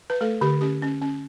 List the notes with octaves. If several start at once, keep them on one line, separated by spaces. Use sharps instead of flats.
B4
A3 A4
D3 G4
C#4 G4
C#4
C#4